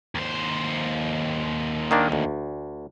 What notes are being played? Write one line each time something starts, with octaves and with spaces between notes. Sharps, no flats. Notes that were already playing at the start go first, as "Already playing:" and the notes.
D#2 C5
D#3 A#3 D4
D2